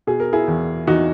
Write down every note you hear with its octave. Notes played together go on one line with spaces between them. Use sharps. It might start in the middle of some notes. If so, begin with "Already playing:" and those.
B2 G#4
A#4
E4 G#4
E2
E2 D#4 F#4